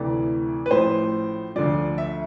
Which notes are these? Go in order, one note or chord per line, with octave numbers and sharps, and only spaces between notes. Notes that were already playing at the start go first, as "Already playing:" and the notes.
Already playing: D2 C3 E3 D5
B4
A1 A2 F3 C5
D2 D3 F3 D5
E5